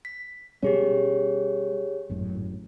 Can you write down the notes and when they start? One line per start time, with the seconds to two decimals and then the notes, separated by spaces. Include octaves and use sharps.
0.05 B6
0.63 B2 G3 C#4 G4 G#4 C#5
2.09 G#1 F#2 A2